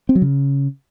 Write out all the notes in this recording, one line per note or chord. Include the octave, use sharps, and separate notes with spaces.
C4
F#3
C#3